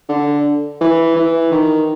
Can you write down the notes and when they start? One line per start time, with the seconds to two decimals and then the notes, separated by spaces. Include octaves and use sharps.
0.09 D3
0.81 E3
1.16 E3
1.52 D#3